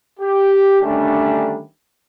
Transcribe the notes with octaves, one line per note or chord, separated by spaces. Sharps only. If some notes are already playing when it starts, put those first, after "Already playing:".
G4
D3 D#3 G3 A3 C#4 D4